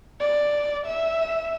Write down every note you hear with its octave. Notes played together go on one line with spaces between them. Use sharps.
D5
E5